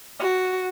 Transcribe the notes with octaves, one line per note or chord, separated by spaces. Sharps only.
F#4